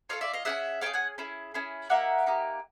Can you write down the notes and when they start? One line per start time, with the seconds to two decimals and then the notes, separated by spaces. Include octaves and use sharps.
0.09 C#4 F4 A4 D#5 F5
0.21 D5 E5
0.33 D#5 F5
0.45 C#4 E4 G#4 E5 F#5
0.81 C#4 E4 F5 G5
0.86 G#4
0.94 F#5 G#5
1.18 C#4 E4 G#4
1.54 C#4 E4 G#4
1.90 A#3 D#4 G4 E5 F#5
2.26 A#3 D#4 G4